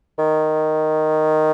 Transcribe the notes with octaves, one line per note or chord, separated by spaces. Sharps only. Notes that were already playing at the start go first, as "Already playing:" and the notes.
D#3